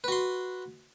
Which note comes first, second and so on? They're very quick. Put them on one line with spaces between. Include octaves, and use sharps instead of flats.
B4 F#4 C6